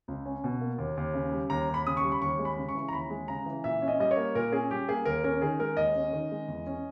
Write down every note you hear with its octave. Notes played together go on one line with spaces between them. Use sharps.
C#2
C#4
B2
A#3
D#2
D#2
C#3
G3
D#2 A#5
D#2
B5
C#3 D#6
C#6
G3
B5
D#2 C#6
G#3
B5
C#3
C#6
E3
A#5
D#2 B5
G#3
C#3 A#5
E3
A#2 E5
C#4
D#5
G3 D#5
C#5
A#3
A#2 A#4
C#4 G#4
G3 G4
A#3 G#4
D#2 A#4
C#4 A#4
D#3 G#4
G#3 A#4
D#2 D#5
C#4
D#3
G#3
E2
C#4